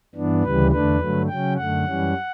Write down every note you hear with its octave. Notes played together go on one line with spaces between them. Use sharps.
G2 E3 B3 D4
D2 C#3 E3 G3 B4
E2 D3 A3 D4 B4
G2 D3 F#3 A3
C#3 F#3 C#4 G5
F#2 D3 A3 F#5
F#2 E3 G3 C#4